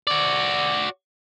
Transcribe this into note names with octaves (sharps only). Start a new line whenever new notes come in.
F#4 D5